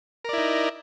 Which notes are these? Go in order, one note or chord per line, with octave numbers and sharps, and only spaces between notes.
D#4 E4 A#4 D5